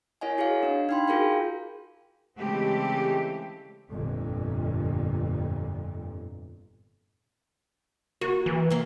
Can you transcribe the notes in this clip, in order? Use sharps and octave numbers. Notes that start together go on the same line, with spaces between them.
E4 A#4 C#5 D#5 F#5 G#5
F#4 G#4 C#5 D#5 F5
D4 F5
D#4 F5 G5 B5 C6
F4 F#4 G#4 A#4 F5 G5
C#3 E3 G#3 A3 C4 G4
G1 F2 A#2
A#3 F#4
E3
E3 A#3